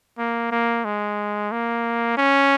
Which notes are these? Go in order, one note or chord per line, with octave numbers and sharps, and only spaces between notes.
A#3
A#3
G#3
A#3
C#4